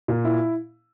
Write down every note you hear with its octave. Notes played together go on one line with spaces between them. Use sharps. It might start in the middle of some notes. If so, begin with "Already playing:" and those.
A#2
E4